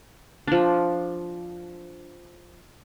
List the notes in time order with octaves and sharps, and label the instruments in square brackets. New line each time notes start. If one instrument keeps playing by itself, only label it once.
[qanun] F3 D4